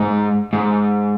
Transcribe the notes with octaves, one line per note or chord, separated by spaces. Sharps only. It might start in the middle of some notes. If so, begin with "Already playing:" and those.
Already playing: G#2
G#2